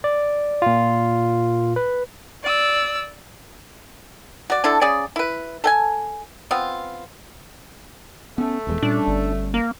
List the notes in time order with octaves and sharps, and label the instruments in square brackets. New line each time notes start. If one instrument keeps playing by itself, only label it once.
[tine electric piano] D5
A#2 F4
B4
[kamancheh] D5 E6
[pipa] F#4 D5
D3 D4 E4 A4
C#3 C#4 G#4 D5
E4 B4
A4 G5 G#5
B3 C4 F4
[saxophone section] A3 [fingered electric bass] B3 C#4
[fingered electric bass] D#1 E2 G#3
[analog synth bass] A#2 [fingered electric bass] G3 C#4 [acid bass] D4
[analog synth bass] G1
[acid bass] A#3